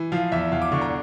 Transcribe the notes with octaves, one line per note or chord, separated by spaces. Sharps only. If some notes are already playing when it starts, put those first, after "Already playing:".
Already playing: E3
F3 F5
E2 E5
E2 F5
D6
D3 C#6
A#5